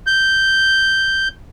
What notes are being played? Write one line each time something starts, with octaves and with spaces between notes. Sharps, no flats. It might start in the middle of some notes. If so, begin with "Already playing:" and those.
G6